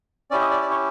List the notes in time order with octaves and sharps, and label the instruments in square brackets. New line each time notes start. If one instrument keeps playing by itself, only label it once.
[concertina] C#4 E4 G4 D5
D#5
D5
D5
C#5